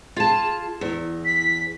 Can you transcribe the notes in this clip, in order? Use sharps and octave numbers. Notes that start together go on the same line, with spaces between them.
F4 G#4 A5
E2 E4
B6